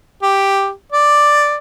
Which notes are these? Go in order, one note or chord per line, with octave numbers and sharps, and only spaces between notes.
G4
D5